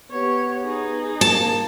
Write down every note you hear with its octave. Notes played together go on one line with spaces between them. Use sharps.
B3 G4 C#5
D#4 G#4
A#3 A5